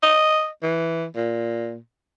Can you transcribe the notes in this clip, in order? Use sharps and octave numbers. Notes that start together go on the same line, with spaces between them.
D#5
E3
A#2